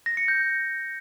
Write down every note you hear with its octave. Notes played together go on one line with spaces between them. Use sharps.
A#6
C#7
G6